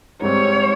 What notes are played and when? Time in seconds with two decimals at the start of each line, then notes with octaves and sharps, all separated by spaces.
0.22 G#2 G3 C4 C#5